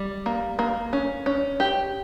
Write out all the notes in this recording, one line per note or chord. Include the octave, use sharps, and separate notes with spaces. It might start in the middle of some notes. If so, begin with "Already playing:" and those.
Already playing: G3
A#3
A#3
C#4
C#4
G4